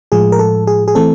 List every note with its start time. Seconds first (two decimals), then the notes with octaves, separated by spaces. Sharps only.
0.12 A2 F3 G#3 G#4
0.32 A#4
0.39 A4
0.67 G#4
0.88 G#4
0.95 E3 A3 C4 A4